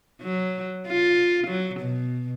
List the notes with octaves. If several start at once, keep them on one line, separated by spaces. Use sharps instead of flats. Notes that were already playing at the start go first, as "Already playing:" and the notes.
F#3
F4
F#3
B2